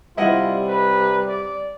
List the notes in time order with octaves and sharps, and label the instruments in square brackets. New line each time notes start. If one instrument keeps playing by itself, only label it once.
[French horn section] C3 G3 [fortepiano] E4 D#5 F#5 [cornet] F4
[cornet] B4
D5